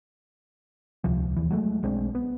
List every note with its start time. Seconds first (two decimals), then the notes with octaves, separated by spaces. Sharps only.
1.04 D#1 C#2 C3 F3
1.36 D#2 E3
1.50 F#3 G#3 A3
1.83 B1 G#3 C4 D4
2.15 B3